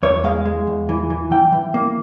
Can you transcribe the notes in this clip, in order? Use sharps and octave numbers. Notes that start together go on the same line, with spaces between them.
E2 C#5
G#3 F5
G#3
E2
E3
E3
E3 G5
E3
A#3